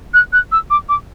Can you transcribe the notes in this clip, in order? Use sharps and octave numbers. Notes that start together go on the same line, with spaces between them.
F#6
F#6
E6
D6
D6